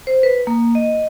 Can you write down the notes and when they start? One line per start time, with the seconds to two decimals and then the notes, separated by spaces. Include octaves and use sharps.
0.07 C5
0.23 B4
0.47 A#3
0.75 D#5